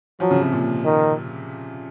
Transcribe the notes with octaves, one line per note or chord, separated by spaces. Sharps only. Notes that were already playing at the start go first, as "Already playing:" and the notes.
F3 F#3
C#3
C3
A#2
D#3